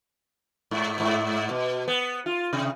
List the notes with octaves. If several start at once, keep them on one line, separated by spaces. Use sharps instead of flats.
G#2
G#2
B2
B3
F4
C3